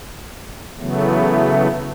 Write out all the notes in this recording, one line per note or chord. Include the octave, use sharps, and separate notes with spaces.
C#3 E3 F#3 A3 B3